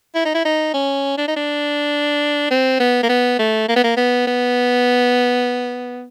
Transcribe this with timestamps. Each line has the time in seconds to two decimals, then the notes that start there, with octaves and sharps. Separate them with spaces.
0.15 E4
0.25 D#4
0.35 E4
0.45 D#4
0.74 C#4
1.18 D4
1.28 D#4
1.36 D4
2.51 C4
2.80 B3
3.03 A#3
3.09 B3
3.39 A3
3.68 A#3
3.76 B3
3.84 A#3
3.97 B3
4.27 B3